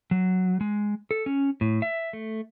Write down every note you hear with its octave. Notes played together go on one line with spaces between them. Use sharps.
F#3
G#3
A4
C#4
A2
E5
A3